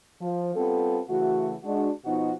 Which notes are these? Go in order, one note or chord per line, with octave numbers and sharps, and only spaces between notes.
F3
G3 B3 C4 F4 A4
C#3 E3 A3 F#4
G#3 D4 F#4
B2 F3 B3 D#4 F#4